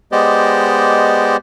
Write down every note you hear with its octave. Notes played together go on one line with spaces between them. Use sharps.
G#3 B3 G4 C5 D5 D#5